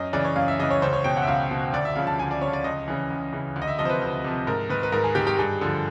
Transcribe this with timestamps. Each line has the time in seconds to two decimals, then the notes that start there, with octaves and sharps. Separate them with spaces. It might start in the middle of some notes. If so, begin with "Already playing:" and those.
Already playing: F#2 D#5
0.13 C#3 E3 D5
0.24 C#5
0.36 F#2 F5
0.48 E5
0.59 C#3 E3 D#5
0.71 C#5
0.82 C#2 C5
0.93 C#5
1.04 B2 G5
1.17 F#5
1.22 E5
1.27 C#2 F5
1.51 B2
1.73 D2 D5
1.85 E5
1.96 C#3 F3 F5
2.07 A5
2.18 D2 G#5
2.31 D5
2.41 C#3 F3 C#5
2.53 D5
2.64 C#2 D#5
2.88 C#3 E3
3.10 C#2
3.33 C#3 E3
3.56 D2
3.62 D#5
3.67 E5
3.79 C3 F3 D#5
3.85 C5
3.89 B4
4.01 D2
4.24 C3 F3
4.47 G#2 A#4
4.70 D#3 B4
4.83 B4
4.92 G#2 A#4
5.04 G#4
5.15 D#3 G4
5.27 G4
5.38 G2 G#4
5.61 D3 F3